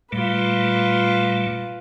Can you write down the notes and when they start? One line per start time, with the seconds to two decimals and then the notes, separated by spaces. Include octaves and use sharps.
0.12 A#2 G3 A3 F4 B4